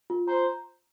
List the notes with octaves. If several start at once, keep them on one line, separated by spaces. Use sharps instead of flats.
F4
C5 A#5